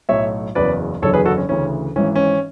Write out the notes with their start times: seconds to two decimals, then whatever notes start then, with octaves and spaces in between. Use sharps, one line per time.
0.09 B1 A2 F#3 C#5 E5
0.55 F#1 E2 C#3 F#3 B4 D5
1.02 F#1 E2 D3 F#3 A4 C#5
1.14 G#4 B4
1.25 F#4 A4
1.38 C#4
1.49 D2 C#3 E3 C#4
1.96 G#1 G#2 E3 C#4
2.16 C#4